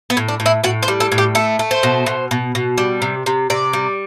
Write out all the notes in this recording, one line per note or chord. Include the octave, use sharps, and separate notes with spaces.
B3
A2
D4
A2
E4
A2 F#4
C5
G3
A4
A2
G4
A3 A4
A3
C5
B2
B2
B2
B2
G3
C3
C3
C3 D5
G3